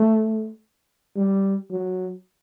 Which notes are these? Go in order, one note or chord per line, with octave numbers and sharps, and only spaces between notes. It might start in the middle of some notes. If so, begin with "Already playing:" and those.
Already playing: A3
G3
F#3